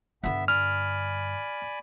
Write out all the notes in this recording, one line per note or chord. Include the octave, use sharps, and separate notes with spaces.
G2 D3 B3 E5
D5 G#5 B5 F6